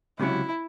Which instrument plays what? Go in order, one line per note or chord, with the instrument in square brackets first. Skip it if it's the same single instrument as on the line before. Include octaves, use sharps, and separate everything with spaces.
[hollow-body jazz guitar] C#2 C3 F#3 C#4 [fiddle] E4